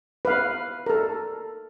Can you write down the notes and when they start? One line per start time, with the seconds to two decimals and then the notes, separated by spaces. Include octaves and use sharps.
0.25 B4 F5
0.86 A4 A#4